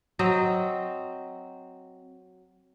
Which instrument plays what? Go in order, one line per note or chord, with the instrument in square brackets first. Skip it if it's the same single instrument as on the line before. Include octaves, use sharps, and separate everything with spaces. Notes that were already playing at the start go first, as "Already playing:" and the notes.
[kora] F#3 C4 D#5